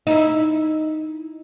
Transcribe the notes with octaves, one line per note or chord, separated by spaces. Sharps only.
D#4 E4